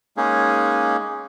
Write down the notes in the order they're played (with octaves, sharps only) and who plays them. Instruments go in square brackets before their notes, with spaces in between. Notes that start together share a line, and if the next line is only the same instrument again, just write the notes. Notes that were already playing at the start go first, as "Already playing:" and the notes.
[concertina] G#3 A#3 C#4 D#4 G#4